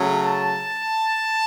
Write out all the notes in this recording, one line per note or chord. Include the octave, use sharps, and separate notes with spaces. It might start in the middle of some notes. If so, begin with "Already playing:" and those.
Already playing: C#3 F#3 A3
A5